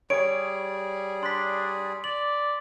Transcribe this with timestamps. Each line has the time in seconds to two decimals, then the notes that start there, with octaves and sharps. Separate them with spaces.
0.10 G3 G#4 C#5 D7
1.23 D4 C6 B6
2.04 D5 F#7